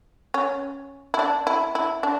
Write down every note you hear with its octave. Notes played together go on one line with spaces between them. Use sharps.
C#4
E4
D4
E4
E4
D4